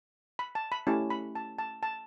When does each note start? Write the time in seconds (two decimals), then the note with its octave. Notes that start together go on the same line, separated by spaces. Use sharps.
0.39 B5
0.55 A5
0.72 B5
0.87 A3 C#4 E4 G4 A5
1.10 B5
1.35 A5
1.59 A5
1.83 A5